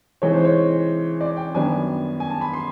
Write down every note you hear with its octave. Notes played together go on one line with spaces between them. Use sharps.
C3 E3 G#3 C4 D#4 C#5
C5
C#5
D5
G5
F#2 D#3 G3 B3 D4 G#5
G#5
A5
B5
C6